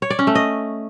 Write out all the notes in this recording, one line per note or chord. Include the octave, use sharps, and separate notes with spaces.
C#5
D5
C#4
A3
D#5